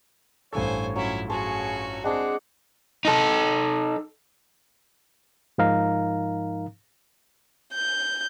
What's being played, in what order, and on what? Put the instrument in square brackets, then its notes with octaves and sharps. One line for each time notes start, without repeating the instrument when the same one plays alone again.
[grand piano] A1 G2 A4 [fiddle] C5 G#5 [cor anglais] C#5
[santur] F#3 F4 [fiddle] C#4 E4
[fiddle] C#4 F#4 [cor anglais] G#4 [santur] C5 A5 C#6
[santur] G#3 D4 G#4 [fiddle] C4 [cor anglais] F#5
[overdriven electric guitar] D#4 A4
[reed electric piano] G#2 F3 D#4 A#4 F5 A#5
[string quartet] G6